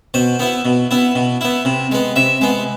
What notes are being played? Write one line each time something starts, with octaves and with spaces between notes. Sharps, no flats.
B2 C5
B3 E4
B2
B3 E4
B2
B3 E4
C3
G#3 B3
C3 E5
G#3 B3